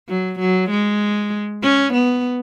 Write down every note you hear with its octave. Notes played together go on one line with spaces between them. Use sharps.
F#3
F#3
G#3
C#4
B3